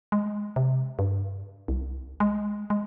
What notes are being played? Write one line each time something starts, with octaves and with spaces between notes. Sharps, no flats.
G#3
C3
G2
C2
G#3
G#3